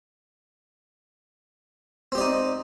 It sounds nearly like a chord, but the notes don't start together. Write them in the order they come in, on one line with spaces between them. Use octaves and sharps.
C4 G4 D5 D#4